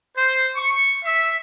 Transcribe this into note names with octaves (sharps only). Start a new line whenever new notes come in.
C5
C#6
E5